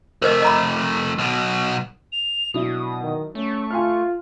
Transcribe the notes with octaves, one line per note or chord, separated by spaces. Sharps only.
F2 A3 A#4 C5 D#5
D#5 A#5 B5
B1 B2
F7
B2 F#3 D4 E4 D#6
D#3
A3 C#4 C#6
F4 G#5 C6 F6